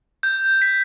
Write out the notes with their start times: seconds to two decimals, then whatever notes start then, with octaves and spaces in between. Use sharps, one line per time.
0.23 G6
0.62 B6